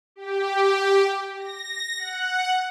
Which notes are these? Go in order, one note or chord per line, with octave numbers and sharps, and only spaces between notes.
G4
A#6
F#5